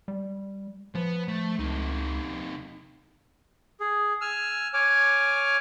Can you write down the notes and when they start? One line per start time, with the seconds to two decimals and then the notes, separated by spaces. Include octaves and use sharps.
0.08 G3
0.95 F3 B3
1.28 A3
1.59 C#2 C3 D#4
3.80 G#4
4.21 G#5 E6 F6
4.74 C#5 G#5 D6 F6